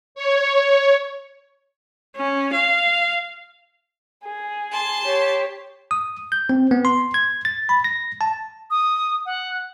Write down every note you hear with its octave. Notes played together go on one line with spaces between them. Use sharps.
C#5
C#4
F5
G#4
A5 C6
G4 C#5
D#6
G6
C4
B3
C6
G#6
A6
B5
A#6
A5
D#6
F#5